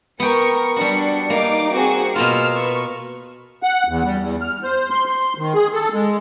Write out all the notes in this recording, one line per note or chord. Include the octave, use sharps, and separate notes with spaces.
B3 A#4 G5 C#6 C#7
G3 D4 F#4 C#7
A#3 D#4 D6
C4 F#4 G#4
B2 A#3 F4 E6 F6
B4 C#6
F#5
E2
G3
E2
F6
C5
C6
C6
D#3
G#4
A4
G#3